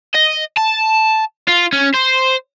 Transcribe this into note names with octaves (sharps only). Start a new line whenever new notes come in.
D#5
A5
F4
C#4
C5